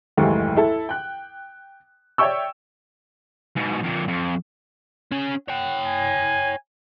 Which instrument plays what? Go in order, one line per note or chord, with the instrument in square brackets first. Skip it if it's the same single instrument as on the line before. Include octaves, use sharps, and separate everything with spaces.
[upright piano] F#1 D#2 G#2 E3 G#3 A3
E4 A4
G5 F#6
C#5 D5 E5 G5 C#6 E6
[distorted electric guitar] G#2 B2
F2 A#2
F2
[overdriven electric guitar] C#4 G#4
[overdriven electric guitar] C#5 G5 [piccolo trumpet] F#5
[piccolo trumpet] G#5